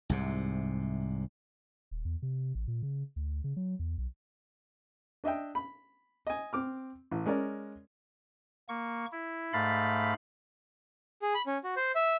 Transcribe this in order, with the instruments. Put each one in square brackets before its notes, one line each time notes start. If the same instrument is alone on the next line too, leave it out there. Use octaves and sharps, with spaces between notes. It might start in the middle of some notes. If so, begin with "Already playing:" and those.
[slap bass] C2 G#2 C3
[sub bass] D#1
E2
C3
A1
A#2
C#3
D2
C#3
F#3
E2
B1
[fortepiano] D4 D#5 E5 G5
B5
D#5 G#5
C4 D6 F6
A1
G#3 C#4 A#4 D5
[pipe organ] A#3 C#6
E4
G#2 A3 F5 B5 A6
[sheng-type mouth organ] G#4
B5
C#4
F#4
C5
E5